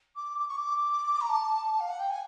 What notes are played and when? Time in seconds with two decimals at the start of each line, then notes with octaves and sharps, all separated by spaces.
0.16 D6
0.39 D6
0.48 C#6
0.57 D6
1.21 A#5
1.29 A5
1.80 F5
1.89 F#5
1.99 G5
2.10 G#5